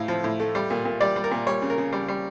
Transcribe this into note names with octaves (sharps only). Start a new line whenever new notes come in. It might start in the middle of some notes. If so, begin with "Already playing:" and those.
Already playing: A2 A3 F5
F3
A2
A3
G3
A#2
A#2
G3 D5
G3
A#4
A#2
G3 C#5
C#3
A#4
C#3
G3
G3